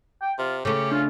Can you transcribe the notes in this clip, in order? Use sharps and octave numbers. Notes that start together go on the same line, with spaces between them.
G5
C3 F4
C#3 A3 C#4 G4
D4 F4